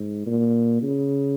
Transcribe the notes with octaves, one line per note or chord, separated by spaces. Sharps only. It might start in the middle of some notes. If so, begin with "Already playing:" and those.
Already playing: G#2
A#2
C#3